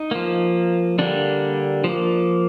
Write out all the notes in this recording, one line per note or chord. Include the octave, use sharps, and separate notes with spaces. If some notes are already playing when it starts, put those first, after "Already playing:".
Already playing: D#4
F3 A#3
D3 G3 A#3 D4
F3 A#3